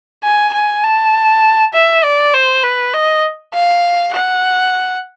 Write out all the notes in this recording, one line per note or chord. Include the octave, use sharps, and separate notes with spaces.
G#5
G#5
A5
E5
D5
C5
B4
D#5
F5
F#5